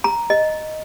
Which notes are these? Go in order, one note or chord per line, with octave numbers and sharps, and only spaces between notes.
A#5
D#5